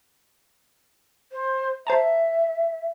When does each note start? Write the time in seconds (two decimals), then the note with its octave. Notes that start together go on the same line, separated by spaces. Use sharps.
1.32 C5
1.87 C5 E5 A5 A#5